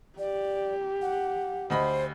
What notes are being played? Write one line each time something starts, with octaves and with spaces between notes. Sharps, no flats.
G4 D5
F#5
D2 C5 D#5 B5